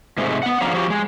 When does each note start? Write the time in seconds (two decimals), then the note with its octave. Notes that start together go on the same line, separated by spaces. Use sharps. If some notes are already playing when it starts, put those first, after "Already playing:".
0.18 G#2 C3 G#3 A3
0.43 B3 F#5
0.61 F#2 C#3 F3 D4 F5 A#5
0.73 F3 F#4 G4
0.90 G#3